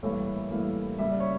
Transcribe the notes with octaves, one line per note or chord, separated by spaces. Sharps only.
A2 E3 G3 A#3 A4 C#5
A2 E3 G3 A#3
C#3 G3 A#3 E5
D5
C#5